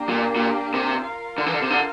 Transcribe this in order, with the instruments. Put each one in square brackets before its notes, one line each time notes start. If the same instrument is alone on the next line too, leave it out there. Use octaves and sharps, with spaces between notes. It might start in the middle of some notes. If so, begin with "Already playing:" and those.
Already playing: [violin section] A#3 D4 G4
[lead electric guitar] A#2
A#2
C3
[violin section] F4 A#4 F5
[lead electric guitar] D3
E3
D3
C3
D3